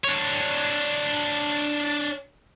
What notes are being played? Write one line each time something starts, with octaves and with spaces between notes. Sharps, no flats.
D4 C#5